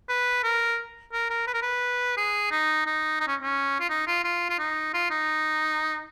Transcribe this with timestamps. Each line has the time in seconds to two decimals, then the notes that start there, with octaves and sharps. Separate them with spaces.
0.09 B4
0.44 A#4
1.13 A#4
1.30 A#4
1.47 B4
1.54 A#4
1.62 B4
2.17 G#4
2.51 D#4
2.86 D#4
3.20 D#4
3.28 C#4
3.42 C#4
3.80 F4
3.90 D#4
4.07 F4
4.24 F4
4.50 F4
4.59 D#4
4.94 F4
5.11 D#4